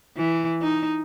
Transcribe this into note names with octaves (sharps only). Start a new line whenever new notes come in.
E3
D#4